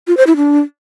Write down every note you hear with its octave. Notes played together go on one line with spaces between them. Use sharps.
F4
C5
E4
D4